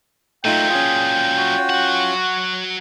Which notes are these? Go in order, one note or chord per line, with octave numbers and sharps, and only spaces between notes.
A#2 F#3 A3 D#4 F4 G5
C#4 F4 G#4
F#4
F#3 F#5